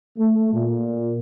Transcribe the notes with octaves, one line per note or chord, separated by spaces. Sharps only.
A3
A#2